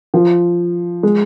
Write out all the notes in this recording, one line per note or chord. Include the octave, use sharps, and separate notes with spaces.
F3
G#3